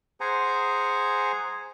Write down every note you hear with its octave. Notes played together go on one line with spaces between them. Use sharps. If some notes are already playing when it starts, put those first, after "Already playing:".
G#4 C5 F#5 G#5 A#5